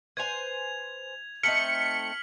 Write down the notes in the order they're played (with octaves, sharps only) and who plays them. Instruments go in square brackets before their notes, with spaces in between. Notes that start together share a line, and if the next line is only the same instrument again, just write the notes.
[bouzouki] B4 C5 G#5 [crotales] G#6 F7
[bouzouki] A3 C4 D#4 [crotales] F6 B6 F#7 [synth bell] C#7